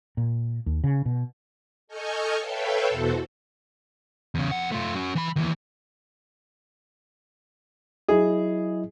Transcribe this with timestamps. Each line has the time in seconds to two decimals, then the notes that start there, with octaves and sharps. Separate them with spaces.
0.17 A#2
0.66 D#2
0.84 C#3
1.06 B2
1.88 A4 D#5 G#5 C#6 F6 G6
2.38 A4 B4 C#5 E5 F5 G5
2.87 E2 B2 E3 F#4 A4 C5
4.35 E2 C#3
4.51 F2 F#5
4.72 A3 F4
4.96 C#4 F#4
5.15 E3 B5
5.36 D#2 E3
8.09 F#3 E4 G#4 D#5